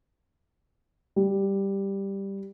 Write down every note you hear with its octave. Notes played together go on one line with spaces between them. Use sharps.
G3